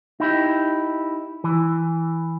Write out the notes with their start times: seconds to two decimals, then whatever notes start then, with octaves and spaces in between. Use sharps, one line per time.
0.20 D#4 E4 G4
1.44 E3